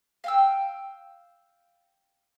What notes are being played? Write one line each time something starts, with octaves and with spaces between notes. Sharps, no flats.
F5 G5 E6